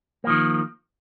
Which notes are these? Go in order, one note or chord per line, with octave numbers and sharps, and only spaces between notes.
D#3 F3 A#3